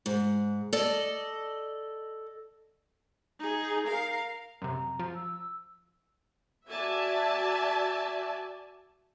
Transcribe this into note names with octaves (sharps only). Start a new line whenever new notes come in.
G#2
A4 D5 D#5
D#4 G#4
A#4 F5
F#2 C3 A#5
F3
E6
F#4 D5 E5 G#5 A5